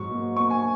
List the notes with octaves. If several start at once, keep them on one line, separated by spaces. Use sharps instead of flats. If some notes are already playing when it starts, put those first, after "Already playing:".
Already playing: G#2 F#3 C#6
A#3
A#3 C#6
G#5